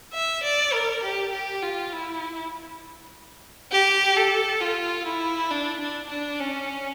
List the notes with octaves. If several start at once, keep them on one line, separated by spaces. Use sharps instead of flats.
E5
D5
A#4
G4
G4
F4
E4
G4
A4
F4
E4
D4
D4
D4
C#4